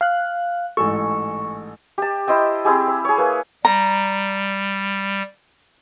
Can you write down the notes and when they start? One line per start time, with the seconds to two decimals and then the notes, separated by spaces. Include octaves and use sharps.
0.01 F5 F#6
0.77 A1 G#2 A4 C#6
1.98 G4 A5
2.27 E4 C5 D#5 G5
2.65 C4 E4 G4 G#4
2.88 B5
3.05 G#4 C#5
3.18 A#3 B4
3.65 G3 A#5